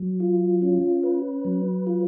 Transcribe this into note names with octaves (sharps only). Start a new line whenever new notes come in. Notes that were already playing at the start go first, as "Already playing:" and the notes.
Already playing: F#3
F4
C#4
B4
F#3
F4